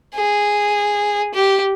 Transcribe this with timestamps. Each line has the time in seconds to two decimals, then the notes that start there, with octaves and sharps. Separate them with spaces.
0.15 G#4
1.34 G4